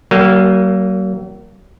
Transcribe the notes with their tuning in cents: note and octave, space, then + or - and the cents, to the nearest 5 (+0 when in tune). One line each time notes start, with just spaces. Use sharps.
F#3 +40 A#3 +0 A#4 -30